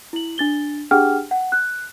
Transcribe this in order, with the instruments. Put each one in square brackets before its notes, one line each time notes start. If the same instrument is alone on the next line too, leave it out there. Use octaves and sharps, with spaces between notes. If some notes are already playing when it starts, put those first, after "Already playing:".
[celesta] E4 F#7
D4 A6 G7
D4 G4 G#4 F#5 G5 F6
F#5
F#6